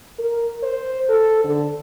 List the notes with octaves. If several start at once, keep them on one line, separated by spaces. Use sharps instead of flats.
A#4
C5
A4
D3